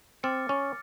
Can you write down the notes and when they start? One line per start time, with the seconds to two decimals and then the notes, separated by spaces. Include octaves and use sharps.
0.23 C4 D6 F6 A6 C#7
0.49 C#4